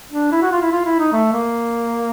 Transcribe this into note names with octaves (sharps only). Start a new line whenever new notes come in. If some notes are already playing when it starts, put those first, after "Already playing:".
D4
E4
F#4
F4
E4
F4
E4
D#4
A3
A#3